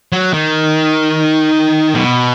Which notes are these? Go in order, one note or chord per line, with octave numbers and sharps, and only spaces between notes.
F#3
D#3
B2